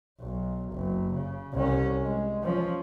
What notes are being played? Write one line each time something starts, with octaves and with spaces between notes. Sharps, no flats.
B1
F#1
C#3
C2 C#4
G#3
F3 C#4